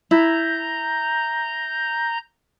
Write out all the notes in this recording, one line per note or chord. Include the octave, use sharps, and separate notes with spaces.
E4 A#5 G6